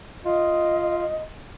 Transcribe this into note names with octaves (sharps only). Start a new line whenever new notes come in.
F4 D#5